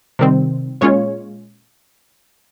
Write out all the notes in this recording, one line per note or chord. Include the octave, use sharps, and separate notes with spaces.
C3 D#3 G3 C4
A#2 G#3 C#4 F4 C#5